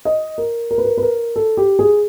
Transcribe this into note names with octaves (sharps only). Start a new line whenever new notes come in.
D#5
A#4
A#4
B4
A#4
B4
A#4
A4
G4
G#4